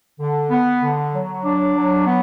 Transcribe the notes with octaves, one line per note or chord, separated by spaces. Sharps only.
D3
B3
D3
F#3
D4
F#3
B3